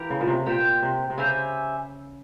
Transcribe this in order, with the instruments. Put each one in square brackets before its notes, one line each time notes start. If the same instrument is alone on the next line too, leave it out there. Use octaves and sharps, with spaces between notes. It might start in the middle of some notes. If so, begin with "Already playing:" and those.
Already playing: [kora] E3 [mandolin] G4 A#4 F5
[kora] C#3
A#2
C3
[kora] A#2 [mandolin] G4 C5 G5
[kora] C3
C3
[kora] C#3 [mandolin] G4 C5 E5 G#5